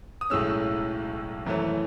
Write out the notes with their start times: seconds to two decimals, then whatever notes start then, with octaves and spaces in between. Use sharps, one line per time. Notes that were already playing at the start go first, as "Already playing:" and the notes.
0.21 D#6
0.30 B1 A2 G#3 C#4 E6
1.46 G#1 F#2 E3 A3 C#4